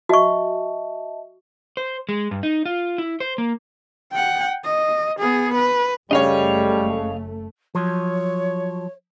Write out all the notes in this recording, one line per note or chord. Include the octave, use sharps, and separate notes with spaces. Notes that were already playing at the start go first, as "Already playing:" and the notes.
F#4 D#5 E5 A5 C#6
C5
G#3
G2
D#4
F4
E4
C5
A#3
F#5 G5
D#5
B3 G#4
B4
F#1 F#2 C#3 G3 A3 C#5 D#5 F5
F3 F#3 C#5